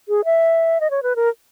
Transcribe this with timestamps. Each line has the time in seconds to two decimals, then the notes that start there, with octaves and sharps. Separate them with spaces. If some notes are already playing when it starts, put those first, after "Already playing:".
0.09 G#4
0.25 E5
0.80 D#5
0.91 C#5
1.03 B4
1.16 A#4